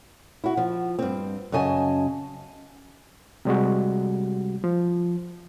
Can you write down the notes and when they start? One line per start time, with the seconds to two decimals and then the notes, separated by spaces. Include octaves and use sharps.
0.44 E4 F#4
0.57 F3
0.99 G2 C4
1.52 F#2 C#3 D#5 G#5 A5
3.45 C3 G3 G#3 F#4
4.64 F3